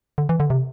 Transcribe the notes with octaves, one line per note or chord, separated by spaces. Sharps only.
D3
E3
D3
C3